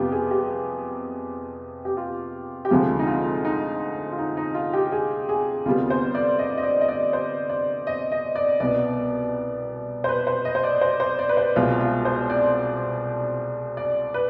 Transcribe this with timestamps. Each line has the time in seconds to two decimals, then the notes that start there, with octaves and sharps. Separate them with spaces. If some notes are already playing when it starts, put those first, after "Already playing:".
Already playing: F2 C3 G3 B3 F4 G4
0.12 G#4
0.31 G4
1.85 G4
1.97 F4
2.65 G4
2.71 D2 C3 F3 G#3 F4
2.99 D#4
3.07 F4
3.45 D#4
4.12 F4
4.18 D#4
4.37 D#4
4.54 F4
4.73 G4
4.92 G#4
5.29 G#4
5.65 D2 C3 G3 B3 F4
5.90 C5
6.15 D5
6.39 D#5
6.58 D#5
6.63 D5
6.81 D#5
6.89 D5
7.13 C5
7.49 D5
7.87 D#5
8.12 D#5
8.35 D5
8.60 C2 B2 B3 D5
10.04 C5
10.09 B4
10.27 C5
10.45 D#5
10.55 C5
10.64 D5
10.81 C5
11.00 C5
11.19 D5
11.29 B4
11.37 C5
11.56 C2 B2 G#3 F4
11.81 F4
12.05 C5
12.30 D5
13.77 D5
14.14 B4